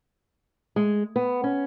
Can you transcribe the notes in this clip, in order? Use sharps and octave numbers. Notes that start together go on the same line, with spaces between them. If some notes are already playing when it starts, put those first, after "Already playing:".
G#3
B3
C#4